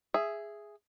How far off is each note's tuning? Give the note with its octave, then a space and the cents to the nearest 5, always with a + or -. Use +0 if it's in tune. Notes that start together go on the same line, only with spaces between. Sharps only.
G#4 +0 E5 +10